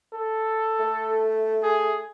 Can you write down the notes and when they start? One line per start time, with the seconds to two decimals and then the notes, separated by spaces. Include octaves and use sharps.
0.14 A4
0.80 A3
1.63 G#4